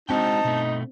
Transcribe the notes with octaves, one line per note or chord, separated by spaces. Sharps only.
G#3 C4 D4 D#4 F#4 G5 A5
B2 A3